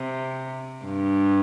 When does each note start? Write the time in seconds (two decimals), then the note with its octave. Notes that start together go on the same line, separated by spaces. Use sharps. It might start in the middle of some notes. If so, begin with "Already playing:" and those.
Already playing: C3
0.85 G2